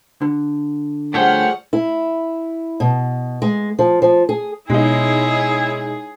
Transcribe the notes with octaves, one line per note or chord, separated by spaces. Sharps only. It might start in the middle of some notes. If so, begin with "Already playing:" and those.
D3
F3 G3 A3 G#4 C#5 F#5 G5 F6
E4
B2
G#3
F3
F3
G#4
B2 G#3 D#4 E4 G#4 C#5